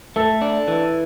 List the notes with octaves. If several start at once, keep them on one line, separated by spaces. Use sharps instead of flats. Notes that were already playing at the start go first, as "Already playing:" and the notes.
A3 A4
D4
E3